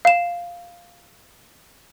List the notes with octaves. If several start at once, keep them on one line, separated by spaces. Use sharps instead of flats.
F5 E7